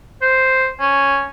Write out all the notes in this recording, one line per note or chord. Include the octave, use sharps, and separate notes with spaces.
C5
C#4